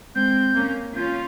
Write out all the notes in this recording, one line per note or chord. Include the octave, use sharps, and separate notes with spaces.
G#3 C4 G6
A#3 C#4
C#4 F4 G6